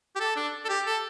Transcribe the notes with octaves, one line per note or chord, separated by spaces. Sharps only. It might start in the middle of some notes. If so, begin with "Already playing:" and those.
G4
A4
D4
A4
G4
A4